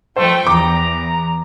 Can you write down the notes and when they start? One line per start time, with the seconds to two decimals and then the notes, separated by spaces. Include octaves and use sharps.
0.16 F3 A3 C5 G5
0.47 E2 A#5 D6